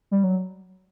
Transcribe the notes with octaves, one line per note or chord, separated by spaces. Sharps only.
G3
F#3